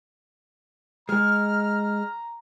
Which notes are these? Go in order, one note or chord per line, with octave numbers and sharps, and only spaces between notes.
G#3 A#5 F6